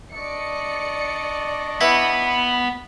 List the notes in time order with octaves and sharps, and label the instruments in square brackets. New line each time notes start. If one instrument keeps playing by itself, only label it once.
[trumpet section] D4 D#5 C#6 [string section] D5 C#7
[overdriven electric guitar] B3 [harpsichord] E4 B4 F#5 [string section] B5